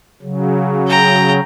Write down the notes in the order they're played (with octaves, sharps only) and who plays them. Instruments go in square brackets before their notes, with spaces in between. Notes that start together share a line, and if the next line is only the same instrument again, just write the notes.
[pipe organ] C#3 F#3
[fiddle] G5 A#5